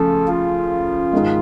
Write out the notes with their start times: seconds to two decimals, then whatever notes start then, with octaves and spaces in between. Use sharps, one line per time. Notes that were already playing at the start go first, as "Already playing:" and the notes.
Already playing: C#3 F3 A3 A4
0.28 F4
1.13 G#2 D#3 G#3